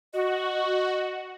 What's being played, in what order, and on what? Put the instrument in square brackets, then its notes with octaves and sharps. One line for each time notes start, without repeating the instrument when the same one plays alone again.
[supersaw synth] F#4 [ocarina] D#5